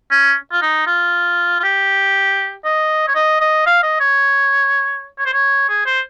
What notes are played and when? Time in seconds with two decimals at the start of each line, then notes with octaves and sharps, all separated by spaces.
0.11 C#4
0.52 F4
0.62 D#4
0.87 F4
1.60 F4
1.63 G4
2.64 D#5
3.08 C#5
3.15 D#5
3.41 D#5
3.66 F5
3.83 D#5
4.00 C#5
5.19 C#5
5.26 C5
5.33 C#5
5.69 G#4
5.86 C5